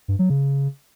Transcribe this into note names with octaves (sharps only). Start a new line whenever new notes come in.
G2
F#3
C#3